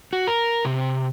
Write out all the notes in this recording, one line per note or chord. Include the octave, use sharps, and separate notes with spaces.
F#4
A#4
C3